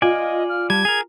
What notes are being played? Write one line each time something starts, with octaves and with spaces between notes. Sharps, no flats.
F4 D5 D#5 G#5
F6
G3 A5 G#6
G#4 A#4 G#6 F7